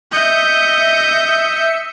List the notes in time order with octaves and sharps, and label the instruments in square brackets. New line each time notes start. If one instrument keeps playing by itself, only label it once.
[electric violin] D#5 G6 [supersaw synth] E5 C#7